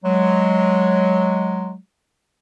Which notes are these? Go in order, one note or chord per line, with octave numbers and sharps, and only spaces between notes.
F#3 G#3